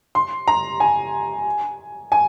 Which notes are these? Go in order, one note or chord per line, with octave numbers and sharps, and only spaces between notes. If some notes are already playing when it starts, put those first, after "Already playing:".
C6
A#5
G#5
G#5